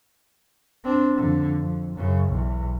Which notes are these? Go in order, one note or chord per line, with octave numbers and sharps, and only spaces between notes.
C4 D4
F2 D3
F2
F#2 C#3
B1 E2